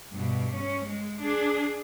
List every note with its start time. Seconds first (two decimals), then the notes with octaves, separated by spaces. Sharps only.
0.12 G2 B2
0.55 C#4
0.84 G#3
1.20 D4 G#4